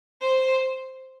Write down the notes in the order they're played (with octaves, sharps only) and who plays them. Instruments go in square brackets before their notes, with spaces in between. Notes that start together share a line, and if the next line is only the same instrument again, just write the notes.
[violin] C5